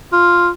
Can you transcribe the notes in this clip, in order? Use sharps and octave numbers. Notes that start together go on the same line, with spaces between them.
F4